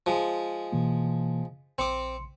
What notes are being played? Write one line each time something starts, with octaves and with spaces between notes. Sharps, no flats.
F3 G#3
B2 E3 A#3
A#1 C4 C6 D6 C#7